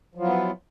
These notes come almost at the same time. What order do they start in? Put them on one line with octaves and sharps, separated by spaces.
F3 F#3 F4 E4 B3